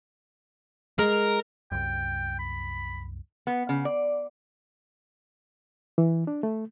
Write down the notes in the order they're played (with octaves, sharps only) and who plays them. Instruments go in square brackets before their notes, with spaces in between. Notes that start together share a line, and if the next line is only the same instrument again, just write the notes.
[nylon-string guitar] G#3 [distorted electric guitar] A#4
[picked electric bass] C2 F#2 [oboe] G5
[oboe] B5
[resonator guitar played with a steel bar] B3
C#3
D5
[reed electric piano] E3
D4
A3